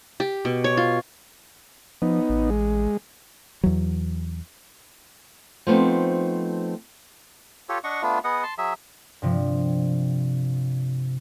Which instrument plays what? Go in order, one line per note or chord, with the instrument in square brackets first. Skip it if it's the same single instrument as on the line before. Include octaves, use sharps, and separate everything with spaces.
[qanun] G4
B2
C#5
F4
[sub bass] F3 [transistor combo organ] B3 D#4
[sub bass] A1
[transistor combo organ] G#3
[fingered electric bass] E2 F#3
[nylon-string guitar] F3 A3 B3 C4 D#4
[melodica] F4 G4 A4 C#5
D4 D#5 F#5 C#6
A3 B3 D4 F4
B3 G#4 D#5 F#5
A5 C6
F#3 G#4 E5
[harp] G2 C3 F3